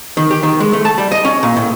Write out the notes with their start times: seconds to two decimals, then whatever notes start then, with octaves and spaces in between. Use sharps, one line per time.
0.17 D#3
0.31 G4
0.43 D#3
0.60 G#3
0.73 A3
0.85 A5
0.98 G3
1.12 D#5
1.25 C#4
1.43 A#2
1.57 A2